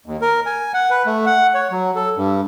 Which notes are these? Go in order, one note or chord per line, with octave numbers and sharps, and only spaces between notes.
D#2
A#4
G#5
F#5
B4
A3
F#5
C#5
F#3
A4
G2